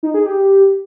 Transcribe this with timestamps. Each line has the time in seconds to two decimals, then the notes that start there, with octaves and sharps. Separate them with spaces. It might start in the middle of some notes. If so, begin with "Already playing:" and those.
0.03 D#4
0.14 G#4
0.26 G4